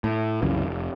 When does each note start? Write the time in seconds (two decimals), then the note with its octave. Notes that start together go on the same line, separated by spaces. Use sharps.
0.04 A2
0.42 C2 F#2 C#3 E3
0.66 F1